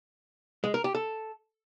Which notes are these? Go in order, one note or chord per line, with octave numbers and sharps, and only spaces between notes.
G#3
A#4
G4
A4